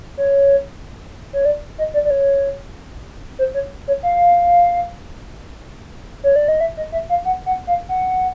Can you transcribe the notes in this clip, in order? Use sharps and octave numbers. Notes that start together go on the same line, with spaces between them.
C#5
C#5
D5
D#5
D5
D5
C#5
C5
C#5
C#5
F5
C#5
D5
D#5
E5
D#5
E5
F5
F#5
F#5
F5
F#5